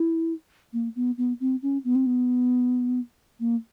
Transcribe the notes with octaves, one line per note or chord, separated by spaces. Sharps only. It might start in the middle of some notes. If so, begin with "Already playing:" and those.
Already playing: E4
A#3
B3
B3
C4
C#4
B3
C4
B3
A#3